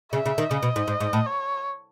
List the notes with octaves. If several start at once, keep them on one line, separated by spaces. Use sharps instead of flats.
C#3 E5
C#3
D#3
C#3 D#5
B2
G#2
G#2
G#2
A2
C#5